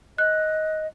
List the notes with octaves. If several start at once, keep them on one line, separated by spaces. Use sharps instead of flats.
D#5 F#6